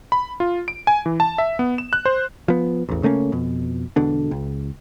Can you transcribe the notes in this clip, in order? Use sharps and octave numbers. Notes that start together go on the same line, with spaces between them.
B5
F4
D7
G#5
E3
A5
E5
B3
E7
F#6
C5
F3 B3
A1 E2
C#3 A3 A#3 C#4
F2 B2
E1 B2 D3 D4
C#2